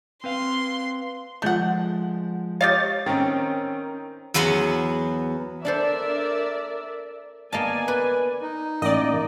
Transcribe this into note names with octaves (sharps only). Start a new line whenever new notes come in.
C4 B4 F5 C6
F3 G#3 A3 F#5 G6
G4 C#5 D#5 F5 A6
D#3 C4 C#4 D#4 A#4
E2 F#3 B3 F#5 C6
D4 A4 A#4 C5 D5 E5
A#3 B3 D5 D#5 G#5 A5
B4
D#4
A1 A#3 D5 D#5